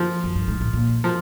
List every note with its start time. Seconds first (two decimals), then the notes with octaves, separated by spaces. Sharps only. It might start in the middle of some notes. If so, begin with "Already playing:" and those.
Already playing: F3
0.24 F#2
0.35 G2
0.48 G#2
0.61 A2
0.73 A#2
1.04 F3